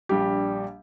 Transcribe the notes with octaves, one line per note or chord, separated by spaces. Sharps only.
A#1 G3 D4 G4